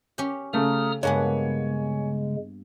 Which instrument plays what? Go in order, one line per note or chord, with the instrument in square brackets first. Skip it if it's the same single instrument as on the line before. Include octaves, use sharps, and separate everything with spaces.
[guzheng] C#4 G4
[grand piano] C#3 A3 [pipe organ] A#5 D#6 F6
[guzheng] G2 A#3 B3 [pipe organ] C#3 G#3 [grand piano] C#5 G#5